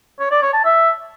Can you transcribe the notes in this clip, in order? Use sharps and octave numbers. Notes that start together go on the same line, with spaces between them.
C#5
D5
C#5
A5
E5